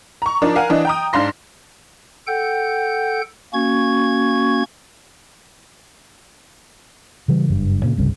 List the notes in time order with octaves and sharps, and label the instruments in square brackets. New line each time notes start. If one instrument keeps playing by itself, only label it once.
[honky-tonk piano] A#5 C#6
F3 D4 D#4 A#4 D5
A#4 F5 F#5 G#5
E3 D4 D#5
G5 A#5 D#6
G#2 D4 F5 C6 A#6
[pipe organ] A4 F#5 G5 G6
A#3 C#4 F#4 C#6 G#6
[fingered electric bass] C#3 E3 G3
F#1 G2
A#2 C#3
F#1 C2 G2 C#3